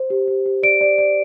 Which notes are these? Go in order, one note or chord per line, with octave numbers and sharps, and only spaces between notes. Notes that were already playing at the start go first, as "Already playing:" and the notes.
Already playing: C5
G4
G4
G4
D5 D7
D5
D5